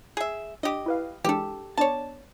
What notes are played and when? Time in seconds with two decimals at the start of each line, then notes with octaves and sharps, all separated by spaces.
0.17 G#4 E5
0.63 D4 G4 D#5
0.86 E4 B4 F5
1.24 E3 G#3 D4 G4 A4
1.77 B3 D4 C#5 D5 A5